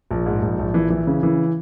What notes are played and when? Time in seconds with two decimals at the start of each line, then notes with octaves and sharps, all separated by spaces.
0.11 A#1
0.26 G#2
0.42 A#1
0.59 A#1
0.74 E3
0.90 E3
1.07 C#3
1.23 E3